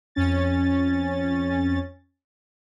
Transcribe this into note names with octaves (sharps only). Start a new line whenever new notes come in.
F2 C#4 A6